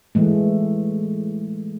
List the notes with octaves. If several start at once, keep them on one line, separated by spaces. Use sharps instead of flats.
E3 G#3 A3